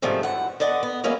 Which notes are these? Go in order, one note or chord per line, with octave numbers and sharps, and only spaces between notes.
G#2 C3 D#3 F3 G3 A3
F#2 E3 F#5
D3 B3 D5 D#5 F#5
B3
F#3 G#3 A#3 B3 C#4 E4